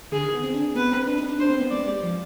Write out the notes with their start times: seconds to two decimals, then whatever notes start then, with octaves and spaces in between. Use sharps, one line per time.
0.12 D3 G#4
0.23 D#3
0.34 B3
0.44 C4
0.54 D4
0.75 B3 B4
0.91 C4
1.08 D4
1.18 D#4
1.28 D4
1.39 D4 C5
1.50 C4
1.60 B3
1.70 G#3 D5
1.87 G3
2.03 F3